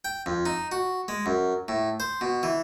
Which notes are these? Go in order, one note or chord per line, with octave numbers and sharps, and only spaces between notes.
G5
F2
D#4
F#4
G#3
F#2
A2
C5
B2
E3